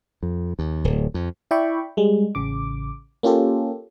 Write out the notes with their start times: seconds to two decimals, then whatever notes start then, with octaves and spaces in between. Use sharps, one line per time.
0.23 F2
0.59 D#2
0.84 D1
1.14 F2
1.51 E4 D5 E5 G5 B5 C#6
1.97 G3 G#3
2.35 A1 C#3 D6
3.23 A#3 C#4 F4 G4 A4